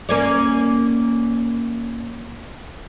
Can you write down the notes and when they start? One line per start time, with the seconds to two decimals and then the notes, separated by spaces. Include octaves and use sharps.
0.09 A#3 C#4 D5